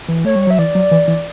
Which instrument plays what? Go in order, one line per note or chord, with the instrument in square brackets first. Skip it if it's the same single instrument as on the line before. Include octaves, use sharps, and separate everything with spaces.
[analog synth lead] E3
[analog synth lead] A3 [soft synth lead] C#5
[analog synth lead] G3
[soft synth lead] C#5
[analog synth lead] F#3 [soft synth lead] E5
[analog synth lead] E3 [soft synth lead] D5
[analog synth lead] F#3
E3
E3